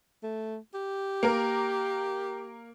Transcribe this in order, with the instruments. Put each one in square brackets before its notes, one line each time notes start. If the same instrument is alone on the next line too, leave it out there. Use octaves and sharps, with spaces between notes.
[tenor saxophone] A3
G4
[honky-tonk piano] A#3 A#4